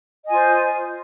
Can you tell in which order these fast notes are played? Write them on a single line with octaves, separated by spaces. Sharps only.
D#5 G#5 F4 C5